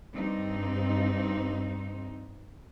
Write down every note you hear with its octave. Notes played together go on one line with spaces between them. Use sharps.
G2 C4 D#4